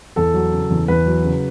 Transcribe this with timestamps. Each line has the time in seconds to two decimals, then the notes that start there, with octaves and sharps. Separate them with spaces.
0.16 E2 A4
0.34 F#3
0.53 C#3
0.70 E2
0.88 E2 B4
1.06 F#3
1.24 C#3